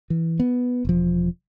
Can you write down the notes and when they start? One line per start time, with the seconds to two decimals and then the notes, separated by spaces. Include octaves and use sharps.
0.10 E3
0.40 B3
0.85 E1 F3